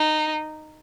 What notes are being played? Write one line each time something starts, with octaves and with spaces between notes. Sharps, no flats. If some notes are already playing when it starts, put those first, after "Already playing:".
Already playing: D#4